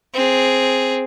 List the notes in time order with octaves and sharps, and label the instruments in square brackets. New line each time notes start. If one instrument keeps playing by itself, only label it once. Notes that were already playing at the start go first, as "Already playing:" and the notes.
[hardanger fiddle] C4 G#4